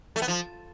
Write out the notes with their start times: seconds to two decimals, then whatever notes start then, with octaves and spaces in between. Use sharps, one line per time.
0.16 A3
0.22 B3
0.28 F3